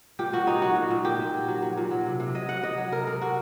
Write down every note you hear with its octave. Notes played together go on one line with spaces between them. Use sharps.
A#2 G4
A#2 F#4
F#3 D#4
F#3 F#4
A#2
A#2
A#2 G4
A#2
F#3
F#3
F#3
A#2
F#3
C3
C3
F#3 D#5
F#3 F#5
F#3 D#5
F#3
C3 A#4
C3 A#4
C3 F#4